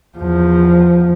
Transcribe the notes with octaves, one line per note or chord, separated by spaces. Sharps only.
E2 F3